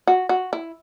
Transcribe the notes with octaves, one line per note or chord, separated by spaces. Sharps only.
F#4
F#4
E4